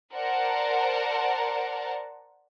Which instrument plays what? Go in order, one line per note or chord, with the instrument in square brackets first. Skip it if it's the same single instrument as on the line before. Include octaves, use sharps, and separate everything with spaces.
[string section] A#4 C5 D5 F#5 A5